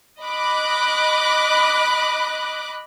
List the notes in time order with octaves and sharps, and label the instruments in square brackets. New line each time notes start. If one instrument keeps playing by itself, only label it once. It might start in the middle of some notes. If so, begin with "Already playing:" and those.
[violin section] D#5 B5 D6 F#6